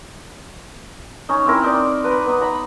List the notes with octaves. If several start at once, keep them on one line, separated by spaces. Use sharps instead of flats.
C#4 D#4
C4 E4 A#4
C4 D#4 D5
B4 A#5
B3 D#4
A#5 B5